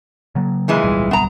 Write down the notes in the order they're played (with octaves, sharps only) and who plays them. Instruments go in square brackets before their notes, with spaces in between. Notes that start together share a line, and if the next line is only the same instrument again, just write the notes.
[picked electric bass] C#3 F#3 A#3
[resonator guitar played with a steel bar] A#2 E3 G#3
[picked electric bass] D1 B1 G3
[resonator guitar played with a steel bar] B3 A#5